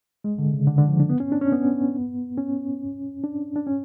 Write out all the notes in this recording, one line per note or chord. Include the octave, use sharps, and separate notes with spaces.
G#3
D3
C#3
D3
D3
F3
D4
B3
C#4
D4
C#4
B3
C#4
D4
D4
C#4